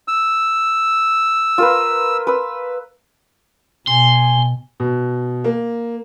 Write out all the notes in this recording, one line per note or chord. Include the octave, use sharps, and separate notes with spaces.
E6
F4 A#4 B4
B4 E6
B2 G#5 C6
B2
A#3